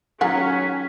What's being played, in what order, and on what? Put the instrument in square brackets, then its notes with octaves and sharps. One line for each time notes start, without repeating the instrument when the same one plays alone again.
[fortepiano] D#3 F#3 [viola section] C#4 [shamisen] F4 G#4 F#5 [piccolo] B6